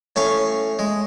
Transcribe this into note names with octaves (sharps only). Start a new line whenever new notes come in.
A2 C#4 F5 C#6
G#3